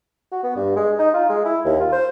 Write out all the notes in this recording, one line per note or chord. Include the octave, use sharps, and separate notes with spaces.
F#4
B3
G2
G#3
D#4
F4
G#3
E4
D#2
F4
C5